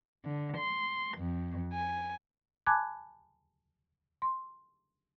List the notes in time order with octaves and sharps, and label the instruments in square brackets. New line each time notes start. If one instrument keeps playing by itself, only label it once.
[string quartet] D3
C6
F2
G#5
[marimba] G#5 A5 B5 D6 F#6 G#6
C6